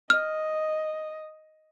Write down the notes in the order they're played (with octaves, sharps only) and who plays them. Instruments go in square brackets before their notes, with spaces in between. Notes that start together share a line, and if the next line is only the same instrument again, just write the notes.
[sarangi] D#5 [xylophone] F6